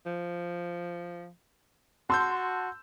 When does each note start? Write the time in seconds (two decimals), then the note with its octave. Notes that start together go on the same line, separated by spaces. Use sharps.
0.06 F3
2.10 F#4 A5 C6 E6 G6